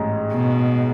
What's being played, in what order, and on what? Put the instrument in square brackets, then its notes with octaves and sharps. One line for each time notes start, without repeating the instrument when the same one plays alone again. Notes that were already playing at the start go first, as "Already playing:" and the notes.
Already playing: [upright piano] A1 G#2 G#3
[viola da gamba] B2